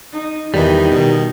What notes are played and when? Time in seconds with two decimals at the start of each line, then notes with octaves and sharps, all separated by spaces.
0.13 D#4
0.54 E2 D#3 E3 G3 D#4
0.92 B2 D#3